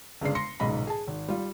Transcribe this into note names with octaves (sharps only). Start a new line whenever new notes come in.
G1 C#3 G#3 D4 C7
C6 A#6 C#7
D#1 B1 G#2 C#3 D#5 B5
G#4 A5
G#1
G3 F4